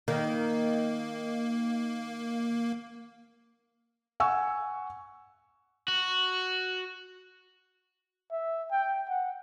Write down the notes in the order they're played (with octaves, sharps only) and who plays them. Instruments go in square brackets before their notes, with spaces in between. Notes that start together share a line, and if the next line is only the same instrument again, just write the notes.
[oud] D#3 [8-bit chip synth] A#3
[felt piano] F#5 G#5 C#6 E6
[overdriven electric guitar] F#4
[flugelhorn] E5
G5
F#5